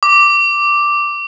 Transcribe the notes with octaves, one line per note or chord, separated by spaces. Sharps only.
D6